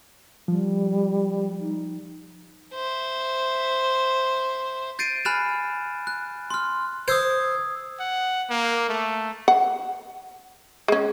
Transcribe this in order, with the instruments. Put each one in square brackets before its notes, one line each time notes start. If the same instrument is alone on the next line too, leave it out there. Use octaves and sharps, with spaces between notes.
[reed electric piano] F3 [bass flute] G3
[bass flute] D#4
[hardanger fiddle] C5 E5
[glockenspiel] G6 A6 C7 D7 D#7
G#5 B5 F6 F#6 A6 E7
F#6
C6 F6
[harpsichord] C5 [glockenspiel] D#6 E6 G#6
[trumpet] F#5
A#3
A3
[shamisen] F#5
G#3 C#4